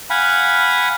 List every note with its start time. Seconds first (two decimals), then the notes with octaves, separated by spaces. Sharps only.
0.10 F5 F#5 G#5 B5